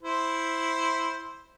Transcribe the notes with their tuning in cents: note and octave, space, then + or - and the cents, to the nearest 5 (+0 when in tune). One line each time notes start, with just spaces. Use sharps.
E4 +0 C5 +5